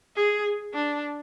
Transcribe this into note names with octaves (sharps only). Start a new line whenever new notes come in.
G#4
D4